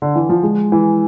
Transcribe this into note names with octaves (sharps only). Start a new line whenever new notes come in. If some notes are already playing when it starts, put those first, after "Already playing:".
D3
E3
F3
G#3
E3